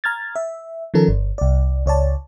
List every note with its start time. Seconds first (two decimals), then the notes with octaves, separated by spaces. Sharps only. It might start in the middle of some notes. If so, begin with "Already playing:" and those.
0.04 A#5 F6 G#6 A6
0.36 E5
0.94 D#3 F3 C#4 A4 A#4
1.08 G1
1.38 C2 D5
1.86 C#2 C#5 D5 A5